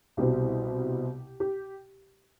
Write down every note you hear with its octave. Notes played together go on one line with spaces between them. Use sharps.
C2 B2 G3 C4 G4
G4